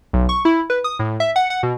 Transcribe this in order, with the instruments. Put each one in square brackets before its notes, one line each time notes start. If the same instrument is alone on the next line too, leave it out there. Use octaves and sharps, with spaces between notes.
[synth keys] B1
C#6
E4
B4
D#6
A2
E5
F#5
F#5
B2